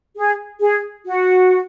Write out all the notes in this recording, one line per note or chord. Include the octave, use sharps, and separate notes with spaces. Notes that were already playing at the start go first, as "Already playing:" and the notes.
G#4
G#4
F#4